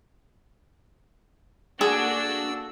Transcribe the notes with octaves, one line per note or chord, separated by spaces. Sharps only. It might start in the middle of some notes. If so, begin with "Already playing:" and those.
A#3 D4 F#4 G#4 A4 E6